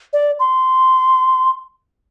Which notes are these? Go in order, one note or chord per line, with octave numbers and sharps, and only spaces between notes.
D5
C6